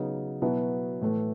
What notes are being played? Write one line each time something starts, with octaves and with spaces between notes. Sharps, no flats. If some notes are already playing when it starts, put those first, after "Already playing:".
Already playing: C#3 F#3 B3 D#4
B2 F#3 B3 E4
A2 E3 A3